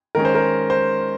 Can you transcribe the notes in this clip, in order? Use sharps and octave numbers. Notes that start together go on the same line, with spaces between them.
D#3 G#3 C#4 A#4
C5
A#4
C5